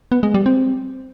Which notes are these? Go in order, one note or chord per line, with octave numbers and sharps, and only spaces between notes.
B3
G#3
G3
C4